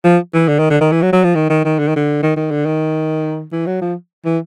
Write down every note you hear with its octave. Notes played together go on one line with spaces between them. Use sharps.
F3
E3
D3
D#3
D3
D#3
E3
F#3
F#3
F3
D#3
D#3
D#3
D3
D#3
D3
D#3
D#3
D3
D#3
E3
F#3
F3
E3